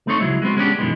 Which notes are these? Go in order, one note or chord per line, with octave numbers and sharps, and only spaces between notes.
A3 C4 D#4 C#5
C#2 F#3 G#3 E4
G#3 B3 C4 F#4
G#3 B3 C#4 D4 G4
F#2 B2 D#3 E3 G#3